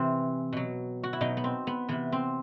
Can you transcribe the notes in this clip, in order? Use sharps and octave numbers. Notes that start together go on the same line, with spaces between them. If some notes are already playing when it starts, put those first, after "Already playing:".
Already playing: C3 E3 C4
B2 F#3
F#4
E4
B2 F#3 D#4
B3
C4
B3
C3 E3 B3
C4